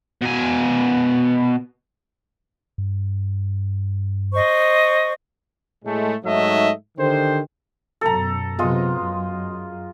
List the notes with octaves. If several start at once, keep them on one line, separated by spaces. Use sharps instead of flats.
B2 G#5
G2
C5 D#5 C#6
A2 G#3 A3
G#2 F#3 A3 D#4 D#5 E5
D3 D#3 G4 C5
F#2 B2 A4 A#5
C3 F#3 G#3 B3 F4 D#5
F#2